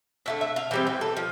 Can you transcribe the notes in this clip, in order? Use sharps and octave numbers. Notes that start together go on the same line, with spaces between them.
D3 A3 E4 F5
E5
F5
E3 G3 C4 G5
G5
A4
F3